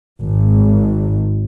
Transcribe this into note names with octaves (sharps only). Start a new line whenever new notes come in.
G#1